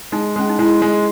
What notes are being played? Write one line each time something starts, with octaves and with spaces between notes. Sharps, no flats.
G#3 D#4
G#3 C#4
D#4
G#3 E4
G#3